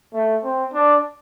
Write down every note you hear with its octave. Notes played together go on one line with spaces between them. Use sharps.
A3
C4
D4